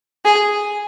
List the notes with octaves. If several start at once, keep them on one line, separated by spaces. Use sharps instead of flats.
G#4